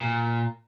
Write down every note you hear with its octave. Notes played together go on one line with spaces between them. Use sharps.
A#2